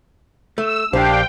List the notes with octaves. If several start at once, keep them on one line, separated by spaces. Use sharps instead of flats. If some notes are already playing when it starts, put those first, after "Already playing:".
A3 E6
A#1 D4 G4 C5 F5 G5